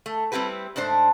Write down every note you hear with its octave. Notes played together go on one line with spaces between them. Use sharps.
A3
G3 C4 E4 G4 B4
G#2 A3 D4 C5